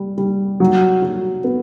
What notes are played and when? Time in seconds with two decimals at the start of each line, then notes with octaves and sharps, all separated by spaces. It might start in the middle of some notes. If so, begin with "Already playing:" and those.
Already playing: G3
0.18 G3
0.60 F#3
1.02 F#4
1.44 B3